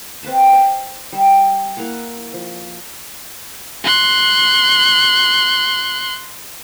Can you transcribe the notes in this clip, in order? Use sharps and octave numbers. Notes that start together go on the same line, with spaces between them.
C4 B4 F5 A5
C5 B5
G3 E5
A#3 E4 F5 F#5
F3
C6 F#6